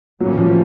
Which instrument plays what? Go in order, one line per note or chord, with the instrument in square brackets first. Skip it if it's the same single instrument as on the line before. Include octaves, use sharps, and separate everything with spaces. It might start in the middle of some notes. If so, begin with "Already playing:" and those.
[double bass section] A2 E3 G3 A#3 C#4 [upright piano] F#3
[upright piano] F3